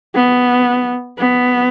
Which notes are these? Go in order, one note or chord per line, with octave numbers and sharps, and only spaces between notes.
B3
B3